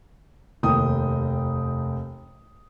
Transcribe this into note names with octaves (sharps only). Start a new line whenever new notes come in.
F1 D#2 G5 D#6